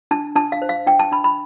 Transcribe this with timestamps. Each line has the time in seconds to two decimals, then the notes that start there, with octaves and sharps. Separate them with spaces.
0.11 D4 A5
0.35 D4 A5
0.52 F5
0.62 C5
0.69 F5
0.86 D4 G5
0.99 A5
1.12 D4 B5
1.24 B5